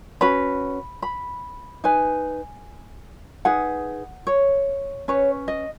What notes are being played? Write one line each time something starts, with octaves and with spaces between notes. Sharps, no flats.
C#4 F#4 B4 B5
B5
D#4 B4 G#5
D#4 G#4 B4 F#5
C#5
C#4 B4 C#5
D#5